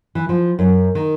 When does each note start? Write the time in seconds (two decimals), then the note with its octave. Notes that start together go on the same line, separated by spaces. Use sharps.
0.15 E3
0.29 F3
0.59 F#2
0.95 D#3